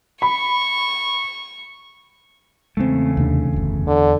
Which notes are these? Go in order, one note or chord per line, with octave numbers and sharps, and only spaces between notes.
B5 C#6
E2 C#3 G#3 A3 B3 C4
D#2 C3 D4
F#1 D2
E2 D3